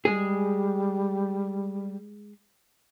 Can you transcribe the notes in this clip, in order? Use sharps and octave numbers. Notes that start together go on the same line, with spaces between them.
G3 G#3 G#4